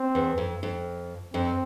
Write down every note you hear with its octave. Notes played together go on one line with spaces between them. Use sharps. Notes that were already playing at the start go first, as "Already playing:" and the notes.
Already playing: C4
E2
F2
F2
F2 C4